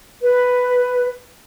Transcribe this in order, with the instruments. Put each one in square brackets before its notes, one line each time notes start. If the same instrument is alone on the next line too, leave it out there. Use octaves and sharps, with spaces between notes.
[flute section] B4